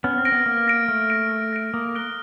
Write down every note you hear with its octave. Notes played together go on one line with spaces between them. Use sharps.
B3 C#4 F6
C4
A#6 D7
B3
A#3 F6
A#6 D7
A3 F6
A#6 D7
F6
A#6 D7
A#3 D#6
F#6 A#6 D7 G7